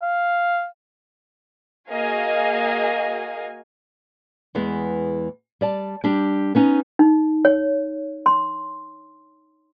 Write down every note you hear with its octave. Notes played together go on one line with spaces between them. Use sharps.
F5
A#3 F#4 G#4 D#5 F5 G#5
E2 E3 G#3 B3
G3 D5 A5
G3 D4 G4
B3 C#4 D#4
D#4
C#5
C6